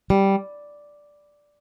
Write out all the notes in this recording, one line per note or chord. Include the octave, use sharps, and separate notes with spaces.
G3